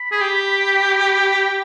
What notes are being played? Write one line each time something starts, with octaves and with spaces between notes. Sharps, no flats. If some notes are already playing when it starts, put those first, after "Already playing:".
Already playing: B5
G#4
G4